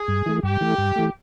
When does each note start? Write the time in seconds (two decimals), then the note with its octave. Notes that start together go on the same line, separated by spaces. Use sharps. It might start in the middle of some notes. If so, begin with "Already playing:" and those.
Already playing: G#4
0.08 G2
0.26 E3 A3
0.43 G2 G4
0.61 E3 A3
0.78 G2
0.96 E3 A3